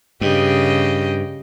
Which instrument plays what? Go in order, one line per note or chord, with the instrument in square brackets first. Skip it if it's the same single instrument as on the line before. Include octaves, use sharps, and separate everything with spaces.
[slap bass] G2 [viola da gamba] C#3 G4 D#5